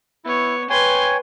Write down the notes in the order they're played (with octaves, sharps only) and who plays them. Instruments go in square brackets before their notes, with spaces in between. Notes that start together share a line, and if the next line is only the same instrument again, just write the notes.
[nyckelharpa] B3 C#5 [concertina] E4
[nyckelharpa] B4 C6 [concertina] C#5 G5 G#5